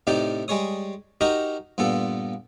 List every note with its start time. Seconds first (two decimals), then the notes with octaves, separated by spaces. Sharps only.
0.07 A2 C3 D#4 G4 D5
0.48 G3 G#3 G#4 C#5 D#6
1.21 D#4 F#4 G4 A#4 D#5
1.78 G2 A#2 B3 A4